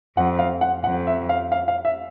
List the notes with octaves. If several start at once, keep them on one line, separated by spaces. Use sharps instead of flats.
F2 F#5
F5
F#5
F2 F#5
E5
F5
F5
F5
E5